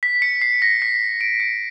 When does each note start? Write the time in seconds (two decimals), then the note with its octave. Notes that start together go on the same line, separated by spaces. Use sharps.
0.03 B6
0.22 C#7
0.42 C7
0.62 A#6
0.82 B6
1.21 D7
1.40 C#7